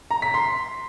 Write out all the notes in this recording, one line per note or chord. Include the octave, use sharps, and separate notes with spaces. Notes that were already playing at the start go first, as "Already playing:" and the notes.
A#5
B6
C6